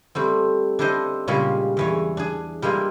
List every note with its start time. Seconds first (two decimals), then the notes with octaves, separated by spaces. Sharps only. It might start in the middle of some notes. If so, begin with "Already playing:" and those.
0.15 G3 A3 C4
0.79 D4 E4 G4 A4 C5 D#5
1.28 A#2 C#3 G3 G#3 C#4 F4
1.77 E2 E3 C#5
2.17 D4 G#4
2.62 G3 G#3 A#3 E4 F4